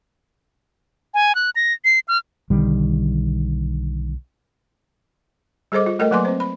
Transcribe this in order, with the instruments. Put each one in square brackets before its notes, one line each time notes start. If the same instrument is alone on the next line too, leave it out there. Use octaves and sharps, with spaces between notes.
[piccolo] G#5
F#6
A#6
C7
F6
[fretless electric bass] B1 D3 D#3 G3
[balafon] G3 G#4 A4 C5 D#5 D6
F4
A3 A4 A#4 D#5 G5
F#3 A#3 B4 G#5 C6 D6
C4 C5
B5